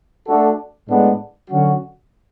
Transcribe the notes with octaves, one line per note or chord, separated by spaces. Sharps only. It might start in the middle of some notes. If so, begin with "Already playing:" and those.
A3 D4 F#4 A4
A2 G#3 B3 D4
D3 F#3 C#4 F#4